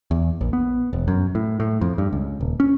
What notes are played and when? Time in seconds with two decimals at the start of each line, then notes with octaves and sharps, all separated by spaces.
0.11 E2
0.41 A#1
0.53 B3
0.93 E1
1.08 F#2
1.35 A2
1.60 A2
1.81 F2
1.98 G2
2.13 C#2
2.41 D#1
2.60 C#4